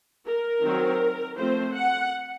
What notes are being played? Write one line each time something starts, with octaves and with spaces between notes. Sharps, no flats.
A#4
D#3 F#3 C4
F3 A3 C4 C5
F#5